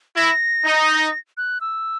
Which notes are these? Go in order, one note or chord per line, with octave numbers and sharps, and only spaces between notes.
E4 A#6
D#4
F#6
E6